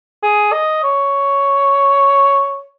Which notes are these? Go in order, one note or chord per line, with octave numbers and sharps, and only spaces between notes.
G#4
D#5
C#5